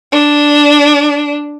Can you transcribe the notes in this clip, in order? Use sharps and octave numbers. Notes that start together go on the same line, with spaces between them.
D4